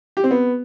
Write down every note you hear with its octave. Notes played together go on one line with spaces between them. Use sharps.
G4
C4
B3